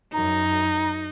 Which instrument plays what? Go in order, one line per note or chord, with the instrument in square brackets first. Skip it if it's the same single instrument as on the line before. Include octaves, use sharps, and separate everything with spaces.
[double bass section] F#2 [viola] D#4 [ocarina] A#5